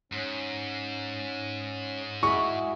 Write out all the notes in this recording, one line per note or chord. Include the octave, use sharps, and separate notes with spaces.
G#2 C#4
G#3 E4 F#4 G#4 B5 C#6